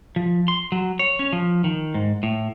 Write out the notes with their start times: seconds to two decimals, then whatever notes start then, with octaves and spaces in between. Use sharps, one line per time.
0.16 F3
0.48 C6
0.72 F#3
0.99 C#5
1.19 C#4
1.33 F3
1.64 D#3
1.94 G#2
2.23 A2